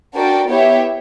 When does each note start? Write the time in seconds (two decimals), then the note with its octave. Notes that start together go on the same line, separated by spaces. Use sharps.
0.15 D4 F#4 A#4 D5 G5
0.49 B3 E4 G4 C#5 E5